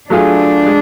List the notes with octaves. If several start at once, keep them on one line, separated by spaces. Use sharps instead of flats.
F#3 A3 D4 F4 G#4
G#3